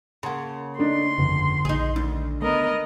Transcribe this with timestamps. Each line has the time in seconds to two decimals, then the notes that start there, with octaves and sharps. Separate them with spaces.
0.23 C#3 A#3 F#5 A5 C6
0.79 A3 D4 D#4 C6
1.18 G1 F2
1.65 A#1 D#4 G#4
1.96 D2 D#3
2.42 A3 B3 A#4 D#5